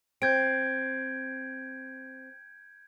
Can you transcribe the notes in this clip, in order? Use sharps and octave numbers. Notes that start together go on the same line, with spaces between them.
C4 G6 G#6 D7